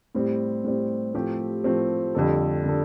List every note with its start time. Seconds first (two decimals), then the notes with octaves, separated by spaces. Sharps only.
0.15 A2 G3 C4
0.64 A2 G3 C4
1.14 A2 F3 A3 C4 G4
1.64 A2 F3 A3 C4 G4
2.15 F2 D3 G3 D4 A4
2.66 D3 G3 D4 A4